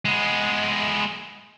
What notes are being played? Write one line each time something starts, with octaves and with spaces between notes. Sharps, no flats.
G#3 B3